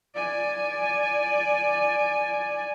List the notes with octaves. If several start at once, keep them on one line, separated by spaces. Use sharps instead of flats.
D5 G#5